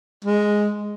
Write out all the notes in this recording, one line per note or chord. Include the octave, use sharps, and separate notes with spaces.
G#3